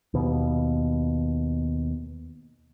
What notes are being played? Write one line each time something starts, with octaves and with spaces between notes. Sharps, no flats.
D#2 B2